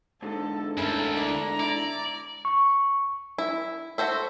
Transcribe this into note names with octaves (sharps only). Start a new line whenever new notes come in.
G#2 D3 A4
D2 G2 C#4 E4 A4 A#4
A3 D4 E4 A#5
E4 D5
C#6
E4
F#4 A4 C5 E5